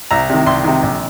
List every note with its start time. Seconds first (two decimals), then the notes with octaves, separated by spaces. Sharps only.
0.11 C2 A#5
0.30 C3 D#3
0.46 C2 C6
0.64 C3 D#3
0.83 A#1